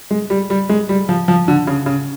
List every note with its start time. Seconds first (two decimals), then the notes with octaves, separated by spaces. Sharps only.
0.11 G#3
0.30 G3
0.50 G3
0.69 G#3
0.89 G3
1.09 F3
1.28 F3
1.48 D3
1.67 C#3
1.86 C#3